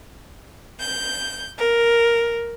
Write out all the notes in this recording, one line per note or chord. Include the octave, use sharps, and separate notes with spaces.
G6
A#4